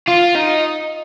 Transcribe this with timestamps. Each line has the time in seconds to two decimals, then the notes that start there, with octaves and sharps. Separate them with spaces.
0.08 F4
0.35 D#4